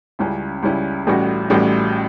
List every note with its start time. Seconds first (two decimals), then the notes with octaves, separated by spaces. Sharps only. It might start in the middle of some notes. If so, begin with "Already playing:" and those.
0.19 C#2 C#3 G3 C#4 E4
0.63 C#2 C#3 G3 C#4 E4
1.07 A1 A2 G3 C#4 F#4
1.50 A1 A2 G3 C#4 F#4